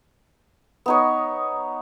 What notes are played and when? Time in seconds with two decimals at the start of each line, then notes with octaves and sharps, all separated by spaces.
0.86 B3 D#4 C#5